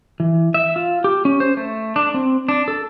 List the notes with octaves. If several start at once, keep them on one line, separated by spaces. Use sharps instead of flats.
E3
E5
F4
G4
C#4
C5
A3
D4
C4
D4
A4